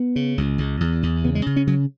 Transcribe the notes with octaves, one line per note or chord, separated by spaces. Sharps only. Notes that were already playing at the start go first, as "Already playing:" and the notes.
Already playing: B3
C#3
C#2
C#2
E2
E2
C#3 B3
G#3
C#3
C#4
C#3 F#3